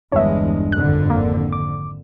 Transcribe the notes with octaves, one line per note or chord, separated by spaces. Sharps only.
G1 E2 G2 G#3 D4 C#5 E5
G#1 F2 D3 F#6
A#3
D6